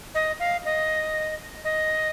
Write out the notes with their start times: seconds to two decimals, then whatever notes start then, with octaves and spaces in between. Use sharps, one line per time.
0.15 D#5
0.40 F5
0.65 D#5
1.64 D#5